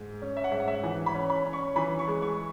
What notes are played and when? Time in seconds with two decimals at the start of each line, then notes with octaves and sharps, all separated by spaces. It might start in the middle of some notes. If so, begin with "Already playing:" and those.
Already playing: G#2
0.22 C#4
0.37 E5
0.44 F#5
0.52 G#2 E5
0.60 F#5
0.68 E5
0.84 E3 F#5
1.06 B5
1.14 C#4
1.30 B5
1.45 C#4
1.53 C#6
1.76 E3 B5
1.99 C#6
2.08 G#3
2.22 C#6